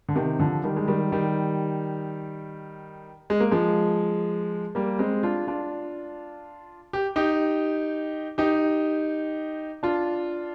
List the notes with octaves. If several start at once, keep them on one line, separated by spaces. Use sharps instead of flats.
D3
C3 D#3
D3 F3
D#3 G3
G#3
D#3 G3
D#3 G3
G#3
A#3
F3 G#3
G3 A#3
G#3 C4
D4 F4
D4 F4
G4
D#4 G4
D#4 G4
D4 F4